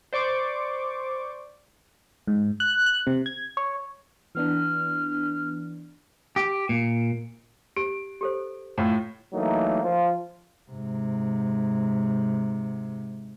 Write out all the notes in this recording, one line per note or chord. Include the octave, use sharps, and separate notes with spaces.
C5 D5 C#6 D6
G#2
F#6
F#6
C3
G#6
C#5
E3 B3 D4 F6
G4
A#2
G4 D7
G4 A4 C5
A2 F4
E3 F#3 A3 A#3 D#4
F3 F4
G#2 C3